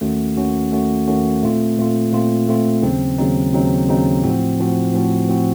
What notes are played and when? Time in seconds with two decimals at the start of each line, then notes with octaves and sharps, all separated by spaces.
0.01 D#2 D#3 A3 C#4 F#4
0.36 D#2 D#3 A3 C#4 F#4
0.72 D#2 D#3 A3 C#4 F#4
1.07 D#2 D#3 A3 C#4 F#4
1.43 A#2 A3 C4 F4
1.77 A#2 A3 C4 F4
2.12 A#2 A3 C4 F4
2.48 A#2 A3 C4 F4
2.82 D#2 C#3 F#3 C4 D#4
3.18 D#2 C#3 F#3 C4 D#4
3.53 D#2 C#3 F#3 C4 D#4
3.88 D#2 C#3 F#3 C4 D#4
4.24 A2 F3 C4 F#4
4.59 A2 F3 C4 F#4
4.93 A2 F3 C4 F#4
5.28 A2 F3 C4 F#4